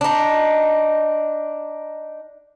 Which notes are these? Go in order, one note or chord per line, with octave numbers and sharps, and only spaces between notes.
D4 D#4